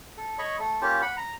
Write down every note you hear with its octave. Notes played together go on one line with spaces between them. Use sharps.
A4
C#5 D#5 B5 C#6
A3 A4
A#3 C#4 F4 G4
F#5 B5
A#5